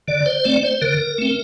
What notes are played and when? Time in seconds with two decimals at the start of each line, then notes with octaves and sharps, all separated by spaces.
0.08 D3 D5
0.26 C5
0.44 A3 C4 D5
0.63 C5
0.82 D3 A#4
1.18 A3 C4